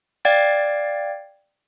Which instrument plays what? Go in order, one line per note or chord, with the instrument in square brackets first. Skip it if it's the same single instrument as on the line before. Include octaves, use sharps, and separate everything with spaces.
[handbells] D5 F5 G5 G#6 A6